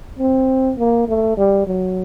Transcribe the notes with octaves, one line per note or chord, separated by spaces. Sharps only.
C4
A#3
A3
G3
F#3